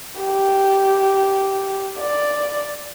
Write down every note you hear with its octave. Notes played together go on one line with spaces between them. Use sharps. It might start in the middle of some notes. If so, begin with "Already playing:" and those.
G4
D5